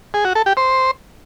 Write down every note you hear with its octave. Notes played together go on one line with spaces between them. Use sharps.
G#4
F#4
A4
G4
C5